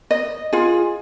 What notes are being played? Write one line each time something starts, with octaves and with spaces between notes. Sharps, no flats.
D#5
F4 G#4